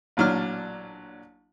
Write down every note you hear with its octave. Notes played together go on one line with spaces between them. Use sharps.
A1 A#2 F#3 D4 F6